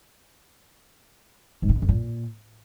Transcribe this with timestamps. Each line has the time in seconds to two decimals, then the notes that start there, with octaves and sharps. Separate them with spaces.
1.62 G#2
1.69 C3
1.76 B2
1.82 F#2
1.89 A#2